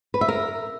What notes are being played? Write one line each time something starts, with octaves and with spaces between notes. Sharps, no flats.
B4
E5
A#4